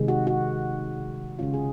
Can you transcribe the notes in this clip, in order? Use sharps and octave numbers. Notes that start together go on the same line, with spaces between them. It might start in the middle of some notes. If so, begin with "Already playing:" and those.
Already playing: C3 D#3 G#3
F#4
F#4
C#3 G#3 C#4 F4
G#4